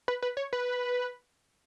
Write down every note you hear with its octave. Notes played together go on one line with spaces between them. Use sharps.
B4
B4
C#5
B4